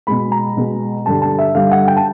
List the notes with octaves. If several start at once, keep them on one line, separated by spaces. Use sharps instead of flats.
B2 G#3 B5
A#5
B2 G#3
G2 D3 G3 A5
A5
E5
G2 D3 G3 F5
F#5
G5
A5